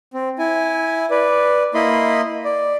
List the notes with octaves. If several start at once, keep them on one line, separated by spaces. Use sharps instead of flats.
C4
E4 G#5
B4 D5
A#3 E4 D#5 B5 C6
D5